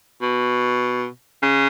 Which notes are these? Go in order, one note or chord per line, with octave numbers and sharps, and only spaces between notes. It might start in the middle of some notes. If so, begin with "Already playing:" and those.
B2
C#3